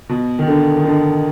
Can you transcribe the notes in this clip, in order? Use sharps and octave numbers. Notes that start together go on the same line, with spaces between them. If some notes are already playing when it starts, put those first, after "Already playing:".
B2
D#3
D3
D#3
D3